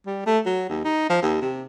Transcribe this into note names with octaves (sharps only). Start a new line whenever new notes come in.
G3
A3
F#3
D#2
D#4
F3
D#2
C3